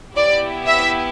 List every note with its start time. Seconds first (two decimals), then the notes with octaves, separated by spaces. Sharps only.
0.16 B3 E4 G4 D5
0.66 E5